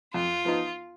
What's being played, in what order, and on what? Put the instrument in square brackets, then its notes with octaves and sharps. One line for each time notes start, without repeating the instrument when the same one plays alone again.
[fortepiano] F2 [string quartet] F4
[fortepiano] F3 B3 D#4